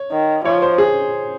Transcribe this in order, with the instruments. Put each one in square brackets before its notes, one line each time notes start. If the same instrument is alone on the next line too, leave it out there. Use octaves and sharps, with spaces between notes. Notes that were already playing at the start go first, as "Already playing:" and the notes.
Already playing: [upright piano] C#5
[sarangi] D#3
[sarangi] F3 [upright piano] C#5
[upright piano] C5
G#4